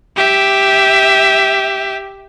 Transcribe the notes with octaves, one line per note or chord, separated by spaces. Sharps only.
G4 E5